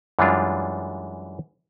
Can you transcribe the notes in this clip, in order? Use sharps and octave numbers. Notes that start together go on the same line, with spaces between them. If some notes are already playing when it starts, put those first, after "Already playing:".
F#2 E3 G3 G#3 D4 F4